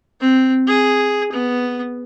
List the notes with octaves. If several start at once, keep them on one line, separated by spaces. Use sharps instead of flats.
C4
G#4
B3